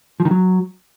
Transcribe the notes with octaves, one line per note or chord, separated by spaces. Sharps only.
F3
D#3
F#3